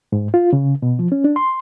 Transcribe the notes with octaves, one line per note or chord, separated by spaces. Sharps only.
G#2
F4
C#3
B2
F3
C#4
D4
C6